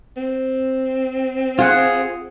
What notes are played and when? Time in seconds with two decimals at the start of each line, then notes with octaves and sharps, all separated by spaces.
0.17 C4
1.59 F4 G#4 F#5